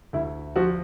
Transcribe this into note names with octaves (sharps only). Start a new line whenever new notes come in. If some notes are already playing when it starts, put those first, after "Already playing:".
D2 E4
F3 F#4